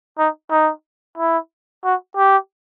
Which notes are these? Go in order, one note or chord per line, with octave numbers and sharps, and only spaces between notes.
D#4
D#4
E4
F#4
G4